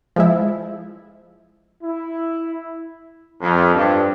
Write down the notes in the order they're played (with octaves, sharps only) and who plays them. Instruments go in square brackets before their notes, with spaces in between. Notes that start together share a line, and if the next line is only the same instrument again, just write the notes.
[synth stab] F3 G#3 E4
[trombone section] E4
F2
G2